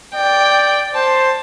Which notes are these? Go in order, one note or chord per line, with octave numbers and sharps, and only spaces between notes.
D5 G5
C5 A5